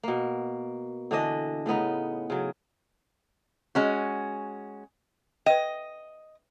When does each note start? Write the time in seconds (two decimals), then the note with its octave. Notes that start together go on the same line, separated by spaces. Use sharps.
0.03 B2 A#3
1.11 D3 E3 D4 D#5
1.66 A2 C#3 B3 D#4
2.30 C#3 F#3
3.75 G#3 C#4 F#4
5.46 B4 D#5 G5